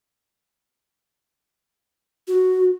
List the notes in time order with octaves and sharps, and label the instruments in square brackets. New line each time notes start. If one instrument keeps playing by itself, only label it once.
[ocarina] F#4